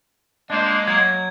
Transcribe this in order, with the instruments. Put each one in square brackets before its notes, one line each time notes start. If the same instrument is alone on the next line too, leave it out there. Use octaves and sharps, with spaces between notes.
[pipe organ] G#3 A#3 [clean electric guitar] D4 C5
[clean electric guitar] F#3 [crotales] G#6